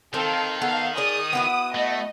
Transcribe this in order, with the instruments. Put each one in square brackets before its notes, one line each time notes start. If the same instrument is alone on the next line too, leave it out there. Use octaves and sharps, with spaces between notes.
[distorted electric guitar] D#3 [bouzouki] C4 [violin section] A4 F5
[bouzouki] B3 A4 [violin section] F5
[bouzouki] G#4 D5 [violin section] D#6
[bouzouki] B3 E4 F#4
[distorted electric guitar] A3 [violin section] D#5